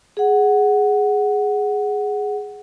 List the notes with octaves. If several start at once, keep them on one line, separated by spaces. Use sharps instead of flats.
G#4 F#5